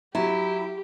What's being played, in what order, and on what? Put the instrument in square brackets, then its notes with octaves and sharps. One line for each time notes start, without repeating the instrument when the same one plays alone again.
[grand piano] F#3 [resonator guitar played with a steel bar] E4 [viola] G4